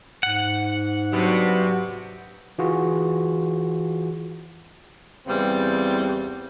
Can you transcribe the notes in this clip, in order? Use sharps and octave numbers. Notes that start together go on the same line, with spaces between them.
G#2 F#5
G2 C3 F#3 B3 F#4
E3 F4 F#4 G#4
E2 C#3 E3 G3 C4